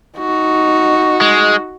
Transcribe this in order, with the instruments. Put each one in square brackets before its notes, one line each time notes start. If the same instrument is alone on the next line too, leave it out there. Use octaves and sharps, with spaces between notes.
[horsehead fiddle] D#4 [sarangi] F#4
[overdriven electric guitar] G#3